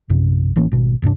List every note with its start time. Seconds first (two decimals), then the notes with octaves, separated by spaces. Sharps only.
0.10 A#1 F#2 C3
0.56 A1 E3 A#3 C#4
0.72 G#1 B2
1.02 D#1 G2 C3 D4